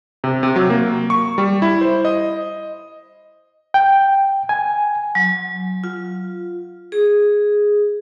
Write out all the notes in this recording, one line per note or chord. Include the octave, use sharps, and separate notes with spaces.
C3
C3
F#3
A#3
C#6
G3
E4
C5
D#5
G5
G#5
F#3
F4
G#4